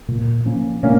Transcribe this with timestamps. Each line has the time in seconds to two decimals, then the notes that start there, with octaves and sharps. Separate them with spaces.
0.08 A#2
0.45 F3 A#3 C#4
0.83 A#2 A#3 C#4